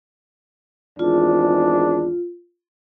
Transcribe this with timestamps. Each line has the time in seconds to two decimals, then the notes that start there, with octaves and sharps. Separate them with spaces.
0.99 G#1 E2 D4 F4